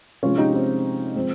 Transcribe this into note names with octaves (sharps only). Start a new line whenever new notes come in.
C3 F3 G#3 C#4 F4
D#4 G4
C4 D#4
F3 G#3 C4